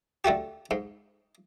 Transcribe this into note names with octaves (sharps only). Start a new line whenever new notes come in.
D3 A3 F#4 G4
G#2